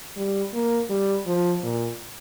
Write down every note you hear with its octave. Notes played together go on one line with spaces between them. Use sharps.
G3
A#3
G3
F3
A#2